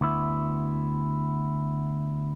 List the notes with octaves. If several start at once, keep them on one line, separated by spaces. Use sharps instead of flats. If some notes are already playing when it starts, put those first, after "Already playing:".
D2 B3 E4